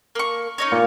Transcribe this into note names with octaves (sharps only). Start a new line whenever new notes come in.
A#3 C#6
C#4 D#4 C#5
A#2